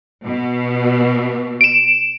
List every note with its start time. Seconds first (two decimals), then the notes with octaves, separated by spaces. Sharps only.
0.24 B2
1.61 D7 E7